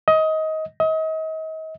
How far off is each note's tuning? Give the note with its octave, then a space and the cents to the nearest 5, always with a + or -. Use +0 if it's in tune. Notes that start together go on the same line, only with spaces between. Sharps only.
D#5 +20
D#5 +35